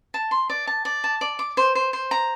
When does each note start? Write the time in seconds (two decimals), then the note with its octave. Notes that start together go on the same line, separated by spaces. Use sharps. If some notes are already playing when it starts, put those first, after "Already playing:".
0.14 A5
0.31 C6
0.50 D5
0.67 A5
0.85 D5
1.04 A5
1.21 D5
1.39 D6
1.57 C5
1.75 C5
1.93 C5
2.11 A#5